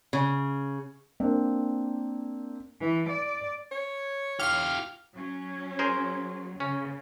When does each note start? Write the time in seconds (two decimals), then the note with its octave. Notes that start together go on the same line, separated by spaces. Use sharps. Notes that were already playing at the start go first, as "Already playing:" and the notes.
0.13 C#3
1.20 A#3 C4 D4
2.80 E3
3.09 D5
3.71 C#5
4.39 F4 G4 F6
5.15 F#3 C#4
5.79 G#4 A#4 C5
6.60 C#3 C#4